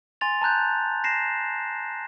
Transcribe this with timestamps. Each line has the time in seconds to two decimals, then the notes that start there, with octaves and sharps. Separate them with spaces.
0.21 G#5 C6 A6 F7
0.42 A5 A#5 F#6 G6
1.04 A#6 C7 E7